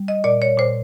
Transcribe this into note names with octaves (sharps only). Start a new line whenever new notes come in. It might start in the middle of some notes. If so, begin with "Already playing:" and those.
Already playing: G3
D#5
A#2 D5
C#5
A#2 C5